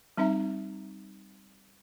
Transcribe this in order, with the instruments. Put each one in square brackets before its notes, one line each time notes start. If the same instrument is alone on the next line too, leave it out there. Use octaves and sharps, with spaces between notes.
[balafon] G3 C4 D#4 E5 A#5